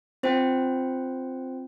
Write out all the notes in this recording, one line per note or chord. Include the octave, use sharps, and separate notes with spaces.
C4 F4 C5 G5